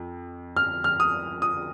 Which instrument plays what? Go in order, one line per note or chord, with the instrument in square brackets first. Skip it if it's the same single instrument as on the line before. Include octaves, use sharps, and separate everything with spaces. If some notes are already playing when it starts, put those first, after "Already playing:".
Already playing: [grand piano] F2
F6
F6
D#6
D#6